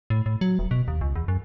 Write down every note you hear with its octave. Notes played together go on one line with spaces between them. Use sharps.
A2
A2
F#3
E1
B2
D#2
C#2
E2
F#2